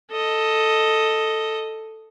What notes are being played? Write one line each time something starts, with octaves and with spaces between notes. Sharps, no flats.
A4 D#5